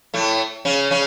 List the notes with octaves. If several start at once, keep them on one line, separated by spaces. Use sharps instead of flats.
A2 A3
C#3 C#4
C#3 C#4